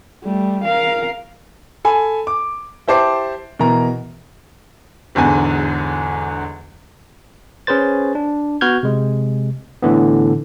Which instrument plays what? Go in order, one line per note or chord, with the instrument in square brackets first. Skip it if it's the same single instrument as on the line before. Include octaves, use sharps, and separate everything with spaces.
[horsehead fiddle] G3 A3
A#4 F5
[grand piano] A4 G#5 B5
D6
E4 G4 C5 A5 D6 C7
B2 E3 A#4 A#5
[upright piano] E1 E2 G#2 D3 G#5
[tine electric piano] C#4 G#4 B4 C5 A6
D4
B3 F#4 B4 F6 G6 G#6
C3 G#3
A2 D3 E3 B3